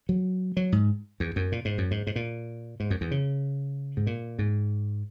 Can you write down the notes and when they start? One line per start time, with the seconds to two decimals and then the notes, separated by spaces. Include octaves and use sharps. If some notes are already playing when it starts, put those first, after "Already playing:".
0.09 F#3
0.57 F#3
0.72 G#2
1.20 E2
1.36 F#2
1.52 A#2
1.65 G#2
1.78 F#2
1.91 G#2
2.07 G#2
2.16 A#2
2.80 G#2
2.90 F#2
3.01 E2
3.11 C#3
3.97 G#2
4.07 A#2
4.39 G#2